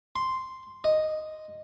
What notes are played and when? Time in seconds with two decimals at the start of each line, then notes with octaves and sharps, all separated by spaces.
0.16 C6
0.84 D#5